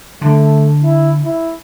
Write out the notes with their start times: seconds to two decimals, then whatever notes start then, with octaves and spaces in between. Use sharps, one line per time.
0.21 D3 A3
0.84 E4
1.24 E4